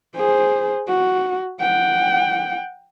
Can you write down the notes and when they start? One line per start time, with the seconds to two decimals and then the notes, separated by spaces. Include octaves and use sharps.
0.16 G#4 C5
0.88 F#4
1.61 F#5 G5